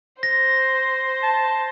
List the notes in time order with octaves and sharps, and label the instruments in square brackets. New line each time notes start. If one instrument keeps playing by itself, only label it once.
[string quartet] C5 [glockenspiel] A#6
[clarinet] A5